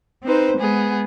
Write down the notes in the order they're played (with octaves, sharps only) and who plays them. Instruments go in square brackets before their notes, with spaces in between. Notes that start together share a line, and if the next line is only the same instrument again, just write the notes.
[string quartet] C4 D#4 B4 C5
G#3 B3 G#4